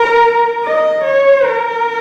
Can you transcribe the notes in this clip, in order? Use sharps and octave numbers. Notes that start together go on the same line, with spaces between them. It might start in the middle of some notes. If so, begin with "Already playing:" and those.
Already playing: A#4
D#5
C#5
A#4